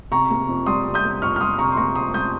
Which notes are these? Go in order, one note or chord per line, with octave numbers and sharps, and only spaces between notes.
C3 A#5 C#6
A#3
F2
G3 C6 D#6
C3
D#6 G6
A#3
F2 C#6 F6
F6
G3 C6 D#6
C3 A#5 C#6
C6
A#3 A#5 C#6
F2 C6 D#6
G3 D#6 G6